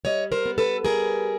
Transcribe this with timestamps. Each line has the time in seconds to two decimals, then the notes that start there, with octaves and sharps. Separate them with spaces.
0.05 G3 C#5 D#5
0.32 A#4 C5
0.46 B3
0.58 A4 B4
0.85 G3 G#4 A#4